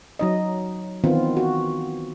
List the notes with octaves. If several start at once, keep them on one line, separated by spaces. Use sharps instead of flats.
F#3 D#4 D#5
D#3 E3 B3 C4 F4
F#4